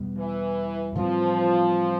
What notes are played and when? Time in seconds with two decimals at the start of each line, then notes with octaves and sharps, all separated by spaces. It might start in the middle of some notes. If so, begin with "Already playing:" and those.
Already playing: E2 B2 G3 B3
0.16 E3
0.95 A2 E3 F3 G3 C4